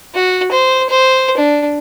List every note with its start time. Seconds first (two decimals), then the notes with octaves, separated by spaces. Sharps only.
0.15 F#4
0.52 C5
0.90 C5
1.37 D4